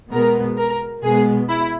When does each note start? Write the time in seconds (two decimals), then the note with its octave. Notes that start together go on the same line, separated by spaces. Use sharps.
0.11 B2 G#3 B3 A#4
0.58 A#4
1.03 B2 G#3 B3 G#4
1.49 E4